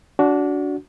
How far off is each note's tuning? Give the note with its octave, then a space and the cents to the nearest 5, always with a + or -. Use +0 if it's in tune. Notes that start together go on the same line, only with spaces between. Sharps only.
D4 -25 F#4 +0